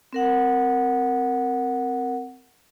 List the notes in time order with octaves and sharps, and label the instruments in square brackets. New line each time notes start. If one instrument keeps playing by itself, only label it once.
[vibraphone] C4 A#4 F#5